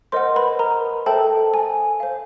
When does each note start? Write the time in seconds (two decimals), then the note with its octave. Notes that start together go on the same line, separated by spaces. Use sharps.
0.12 A#4 C5 D#5 F#5 C6
0.36 B4 B5
0.59 A#4 A#5
1.06 A4 C5 E5 G5 A5
1.54 G#5
2.00 C5 F5